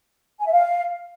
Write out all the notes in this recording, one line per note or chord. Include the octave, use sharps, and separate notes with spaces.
G#5
E5
F5